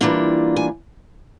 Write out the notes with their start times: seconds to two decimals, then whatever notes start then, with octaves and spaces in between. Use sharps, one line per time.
0.01 E3 G3 A#3 D4 F4
0.56 G#5